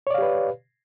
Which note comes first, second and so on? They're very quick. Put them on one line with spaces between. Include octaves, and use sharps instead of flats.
C#5 D5 F5 G4 B4